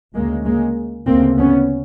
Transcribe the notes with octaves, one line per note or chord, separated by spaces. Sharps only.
D2 C#3 G#3 A#3
G#3 A#3
D2 C#3 A#3 C4
B3 C#4